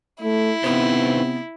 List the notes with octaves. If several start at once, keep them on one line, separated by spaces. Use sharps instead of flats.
A3 E4
C3 B3 D#4 B4 C5